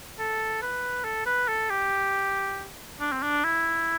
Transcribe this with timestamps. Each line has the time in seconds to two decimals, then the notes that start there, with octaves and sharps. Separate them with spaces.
0.18 A4
0.62 B4
1.04 A4
1.26 B4
1.48 A4
1.70 G4
3.00 D4
3.12 C4
3.22 D4
3.44 E4